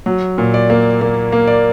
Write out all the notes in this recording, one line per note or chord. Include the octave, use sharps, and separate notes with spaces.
F#3
A#2
D5
A#3
A#3
A#3
D5